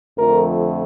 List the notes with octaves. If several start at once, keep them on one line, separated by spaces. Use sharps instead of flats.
F2 D3 F3 A3 A#4